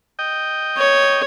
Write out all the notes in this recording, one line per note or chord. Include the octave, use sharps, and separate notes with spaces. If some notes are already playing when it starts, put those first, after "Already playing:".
D#5 G5
C#5